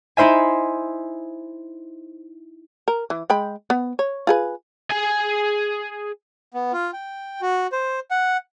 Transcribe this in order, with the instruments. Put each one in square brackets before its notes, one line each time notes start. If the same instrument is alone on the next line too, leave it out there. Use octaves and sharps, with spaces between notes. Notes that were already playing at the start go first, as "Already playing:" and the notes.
[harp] D#4 E4 C5 E5 G#5
[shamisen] A#4
E3
G#3 G5 B5
B3
C#5
F4 G#4 B4
[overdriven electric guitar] G#4 G#5
[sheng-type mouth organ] B3
F4
G5
F#4
C5
F#5